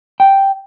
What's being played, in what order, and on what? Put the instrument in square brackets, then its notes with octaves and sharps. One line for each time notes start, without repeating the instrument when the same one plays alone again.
[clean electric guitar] G5